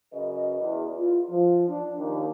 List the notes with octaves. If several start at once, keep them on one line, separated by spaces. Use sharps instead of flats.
F#2 C#3 F#3 B4 D#5
E2
F4
F3
D4
D#2